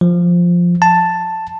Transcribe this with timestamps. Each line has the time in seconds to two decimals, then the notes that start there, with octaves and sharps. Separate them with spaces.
0.01 F3
0.82 A5